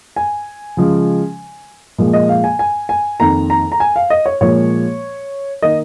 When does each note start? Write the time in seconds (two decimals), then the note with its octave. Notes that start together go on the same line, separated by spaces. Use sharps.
0.16 G#5
0.77 C#3 F3 G#3
1.98 A#2 F3 G#3
2.13 D#5
2.29 F5
2.44 G#5
2.59 G#5
2.89 G#5
3.20 F2 D#3 A#3 A#5
3.50 A#5
3.72 A#5
3.80 G#5
3.96 F5
4.10 D#5
4.26 C#5
4.41 A#2 F3 G#3 C#5
5.62 D#3 A#3 D#5